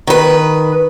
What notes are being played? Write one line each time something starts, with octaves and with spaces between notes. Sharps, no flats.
D#3 B4